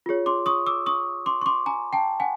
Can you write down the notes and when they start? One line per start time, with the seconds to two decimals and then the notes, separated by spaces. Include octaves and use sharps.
0.06 F4 G#4 C#5
0.26 C6 D6
0.46 C#6 D#6
0.66 D6 E6
0.86 C#6 D#6
1.26 C6 D6
1.42 C#6
1.46 C6 D6
1.66 G#5 A#5
1.93 G5 A5
2.20 F#5 G#5